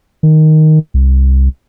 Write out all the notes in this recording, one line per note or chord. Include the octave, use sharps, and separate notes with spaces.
D#3
C2